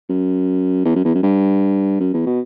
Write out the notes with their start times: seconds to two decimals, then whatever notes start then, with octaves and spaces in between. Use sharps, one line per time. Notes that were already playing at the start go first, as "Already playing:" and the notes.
0.09 F#2
0.85 E2
0.95 F#2
1.05 E2
1.15 F#2
1.23 G2
2.00 F#2
2.14 E2
2.26 B2